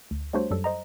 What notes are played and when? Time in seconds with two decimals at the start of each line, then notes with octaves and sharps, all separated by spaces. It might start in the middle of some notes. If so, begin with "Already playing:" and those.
0.11 D2
0.33 G3 A3 D4 F#4 C5 C#5
0.51 F#2 F#3 G3 A4
0.64 C5 D#5 A#5